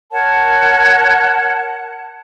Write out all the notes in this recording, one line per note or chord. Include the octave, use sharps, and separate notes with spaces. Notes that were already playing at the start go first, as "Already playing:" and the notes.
A#4 C#5 F#5 A5